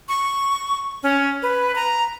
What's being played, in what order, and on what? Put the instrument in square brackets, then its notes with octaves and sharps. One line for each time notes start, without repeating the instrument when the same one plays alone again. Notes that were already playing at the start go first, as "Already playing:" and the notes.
[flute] C#6
C#4
B4
A#5